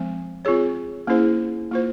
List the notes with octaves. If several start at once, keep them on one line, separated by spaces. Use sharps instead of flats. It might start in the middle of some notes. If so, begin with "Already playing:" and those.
Already playing: F3 G#3 C4
C4 F4 G#4 C#5
A#3 C#4 E4 G#4 C5
A#3 F4 C5